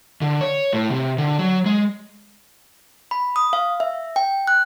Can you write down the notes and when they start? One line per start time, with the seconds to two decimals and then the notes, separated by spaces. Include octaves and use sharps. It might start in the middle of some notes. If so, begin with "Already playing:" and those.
0.21 D3
0.41 C#5
0.73 A2
0.90 C3
1.18 D3
1.39 F#3
1.66 G#3
3.11 B5
3.36 D#6
3.53 F5
3.80 E5
4.16 G5
4.47 F#6